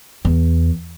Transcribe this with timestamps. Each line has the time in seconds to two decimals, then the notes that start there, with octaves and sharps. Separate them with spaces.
0.25 E2